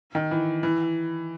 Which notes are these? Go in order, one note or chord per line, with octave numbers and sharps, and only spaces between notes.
D#3
E3
E3